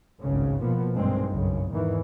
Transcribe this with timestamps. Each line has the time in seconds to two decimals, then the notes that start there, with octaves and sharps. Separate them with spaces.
0.21 G#1 C#2 G2 C#3
0.62 B2 F3 A#3 B3
0.94 B1 G2 A#2 D#3 G#3 C4
1.28 B1 F#2 C#3
1.71 E2 G#2 D#3 E3